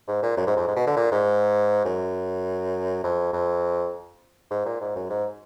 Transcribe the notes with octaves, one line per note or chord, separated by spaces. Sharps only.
G#2
A#2
F#2
G#2
F2
G#2
B2
D3
A#2
G#2
F#2
F2
F2
G#2
A#2
G#2
F#2
G#2